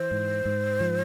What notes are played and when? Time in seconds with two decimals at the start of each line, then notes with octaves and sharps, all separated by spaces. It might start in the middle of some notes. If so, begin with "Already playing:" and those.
Already playing: E3 C5
0.11 G#2
0.45 G#2
0.81 F3